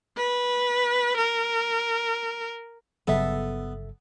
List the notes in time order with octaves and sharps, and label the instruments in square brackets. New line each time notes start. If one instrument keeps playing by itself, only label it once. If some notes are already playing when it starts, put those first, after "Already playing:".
[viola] B4
A#4
[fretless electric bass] G1 C#3 F#3 [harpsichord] B3 [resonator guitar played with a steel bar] A4 E5